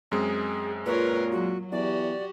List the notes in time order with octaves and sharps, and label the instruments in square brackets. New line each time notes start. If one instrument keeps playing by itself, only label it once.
[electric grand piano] F#2 G#3 C4 [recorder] G#4
[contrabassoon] A#2 [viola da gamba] F4 A#4 C#5 [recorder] B4
[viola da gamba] F#3 [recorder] F#4
[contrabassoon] E2 [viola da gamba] F#4 G4 [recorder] D5